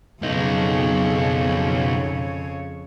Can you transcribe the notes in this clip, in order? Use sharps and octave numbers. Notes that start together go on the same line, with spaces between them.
B1 F2 C#3 D#4 C#5